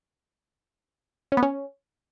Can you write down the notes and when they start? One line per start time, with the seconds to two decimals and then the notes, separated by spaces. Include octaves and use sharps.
1.32 C#4
1.37 B3
1.43 C#4